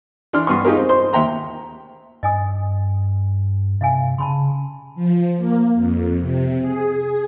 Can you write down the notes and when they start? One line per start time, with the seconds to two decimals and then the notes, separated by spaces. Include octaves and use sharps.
0.33 E3 D4 C6 F6
0.47 G2 B3 C6 C#6
0.65 D#4 F4 G4 G#4 A#4
0.77 C4
0.89 C5 C6
1.13 D#2 E5 G5 A#5 C6
2.23 G2 D#5 G#5 D#6
3.81 C3 E5 F5 G#5
4.18 C#3 A5 B5 C6
4.95 F3
5.37 A#3
5.75 F2
6.21 C3
6.61 G#4